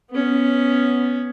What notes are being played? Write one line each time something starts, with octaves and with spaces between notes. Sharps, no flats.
B3 C#4